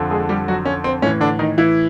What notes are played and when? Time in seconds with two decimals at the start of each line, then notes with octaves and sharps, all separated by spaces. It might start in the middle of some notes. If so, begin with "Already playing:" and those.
Already playing: F2 D3
0.11 G#3 G#4
0.29 G3 G4
0.48 F#3 F#4
0.65 C#4
0.84 C4
1.02 A2 E3 C#4
1.20 D3 D4
1.39 D#3 D#4
1.58 E3 E4